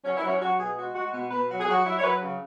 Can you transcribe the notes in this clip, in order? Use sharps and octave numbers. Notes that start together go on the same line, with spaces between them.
F#3 C#4
E4
F#3
C#4
F#3 F#4
B2 G#4
G#3 F#4
G#3 F#4
B2 F#4
B2 B4
F#3 F#4
G#4
F#3 F#4
F#3 E4
C#5
F#3 B4
C#3